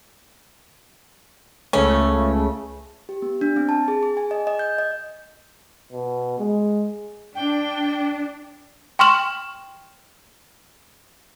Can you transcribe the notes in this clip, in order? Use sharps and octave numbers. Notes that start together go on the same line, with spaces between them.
C#2 C#3 A3 C#4
G4
B3
D4
C4
A5
G#4
G#4
G#5
D#5
D#5
G6
D#5
B2
G#3
D4 G5
G5 C6 C#6 F6 E7 F#7